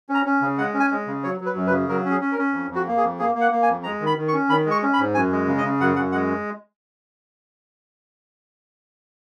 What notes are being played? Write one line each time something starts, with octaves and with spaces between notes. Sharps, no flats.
C#4
A#5
C#4
C#3
G#3 F#5
C#4
G#5
G#3
C#3
F#3 C#5
F#3
B4
F#2
B4
C#3
F#3 A#4
C#4
G#4
C#4
A#4
C#4
F2
F2
F#4
A#3
G#4
F2
A#3 G#4
A#3
F#5
A#3
G#5
F2
G#3 A#5
D#3
B5
D#3
C#6
C#4
D#3 B5
G#3
C#6
C#4
B5
G#2
F#2 G#5
G#3
C#3
D#5
C#3
F#2 F#5
F#2 F#5
G#3 F#5